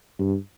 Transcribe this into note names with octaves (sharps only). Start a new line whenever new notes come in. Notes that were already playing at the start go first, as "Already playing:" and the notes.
G2